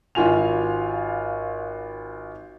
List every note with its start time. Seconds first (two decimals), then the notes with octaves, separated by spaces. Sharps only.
0.15 G#1 F4 F#4 G#5 F7